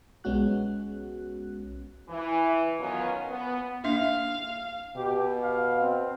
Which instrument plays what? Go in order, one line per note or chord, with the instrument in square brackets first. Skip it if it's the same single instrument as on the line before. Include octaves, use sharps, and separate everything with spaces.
[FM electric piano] B1 G#3 B3 C#4 F#4 F#6
[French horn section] E3
B2 D#3 F#3 B3 C#4 F4
B3
[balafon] A#3 D4 E5 [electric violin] F5
[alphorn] B2 [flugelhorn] G4
[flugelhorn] F5
C4